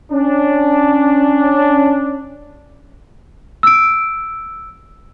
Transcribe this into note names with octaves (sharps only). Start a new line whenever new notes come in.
C#4 D4
E6 D7